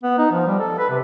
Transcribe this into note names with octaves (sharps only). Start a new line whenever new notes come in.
B3
D#4
F3
G3
A4
B4
C3